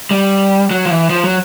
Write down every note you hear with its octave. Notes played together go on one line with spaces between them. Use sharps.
G3
F#3
F3
E3
F3
F#3